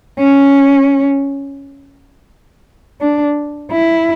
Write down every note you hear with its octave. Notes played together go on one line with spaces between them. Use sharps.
C#4
D4
E4